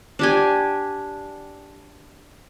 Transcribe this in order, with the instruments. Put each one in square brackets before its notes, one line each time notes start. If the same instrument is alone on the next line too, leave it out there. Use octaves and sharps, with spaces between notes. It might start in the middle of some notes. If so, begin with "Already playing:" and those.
[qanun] D4 G4 G#5